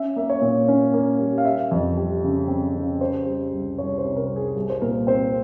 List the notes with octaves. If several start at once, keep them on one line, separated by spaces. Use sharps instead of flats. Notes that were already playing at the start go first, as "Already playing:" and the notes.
Already playing: C#4 E5
A#3 E5
C#5
A#2
C#4
A#3
G3
F5
G3 E5
F2
G3
C#3
C4
C#3
G3 C5
G3
C2
C2 C#5
C5
C3
A#4
G3
G#4
C2
C5
A#2 A#4
C4 C5